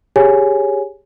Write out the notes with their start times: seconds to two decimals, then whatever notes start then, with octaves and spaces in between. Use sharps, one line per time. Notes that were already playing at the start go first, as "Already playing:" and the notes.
0.16 G4 G#4 C#5 G#5